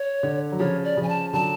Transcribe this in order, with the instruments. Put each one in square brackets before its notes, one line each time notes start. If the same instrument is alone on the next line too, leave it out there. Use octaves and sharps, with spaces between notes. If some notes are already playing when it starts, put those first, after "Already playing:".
Already playing: [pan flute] C#5
[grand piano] D3
F#3
[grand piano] C#3 F3 [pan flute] C#5
[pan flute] D5
[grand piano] C#3 F3
[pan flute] G#5
A5
[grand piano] D3 F#3 [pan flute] A5